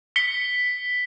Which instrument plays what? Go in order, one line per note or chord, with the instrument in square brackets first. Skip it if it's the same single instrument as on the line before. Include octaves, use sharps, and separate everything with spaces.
[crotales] B6 C#7 G7